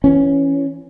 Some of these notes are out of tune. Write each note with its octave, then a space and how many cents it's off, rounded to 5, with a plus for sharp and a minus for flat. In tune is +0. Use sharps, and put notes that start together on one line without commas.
E3 +15 C#4 +0